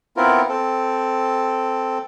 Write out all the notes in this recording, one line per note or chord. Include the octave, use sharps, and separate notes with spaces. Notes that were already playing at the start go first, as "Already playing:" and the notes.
B3 C4 E4 F4 A#4
C4 A4